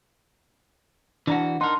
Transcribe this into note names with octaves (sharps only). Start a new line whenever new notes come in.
E3 D4 F#4 A#5
D#4 A#4 F#5 A5 C6